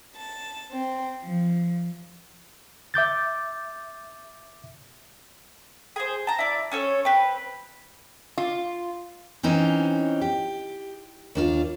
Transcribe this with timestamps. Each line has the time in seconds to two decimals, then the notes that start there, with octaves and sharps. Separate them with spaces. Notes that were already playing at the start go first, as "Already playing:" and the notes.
0.16 A5
0.71 C4
1.23 F3
2.94 E5 D6 G6 A6
5.96 G#4 C5
6.27 A5 A#5
6.39 E4 D5
6.72 C#4 A4 C#5
7.05 C4 B4
8.38 F4
9.43 E3 C4 C#4 D#4
10.21 G4
11.35 D#2 D4 F4